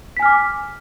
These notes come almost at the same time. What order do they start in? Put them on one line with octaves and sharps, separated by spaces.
B6 G#5 F6 D6